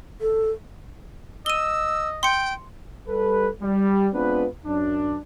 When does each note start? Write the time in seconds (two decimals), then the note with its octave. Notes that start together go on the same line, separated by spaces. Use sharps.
0.21 A4
1.46 D#5 E6 D#7 G7
2.23 G5 C6 C#7
3.08 G3 A4 B4
3.63 G3
4.14 G#3 B3 C4 D4 F4 B4
4.65 F#2 D4